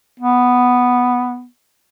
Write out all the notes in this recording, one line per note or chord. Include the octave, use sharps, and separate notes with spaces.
B3